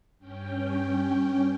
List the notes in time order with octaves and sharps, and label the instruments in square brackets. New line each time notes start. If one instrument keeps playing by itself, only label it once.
[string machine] G2 C#4 G5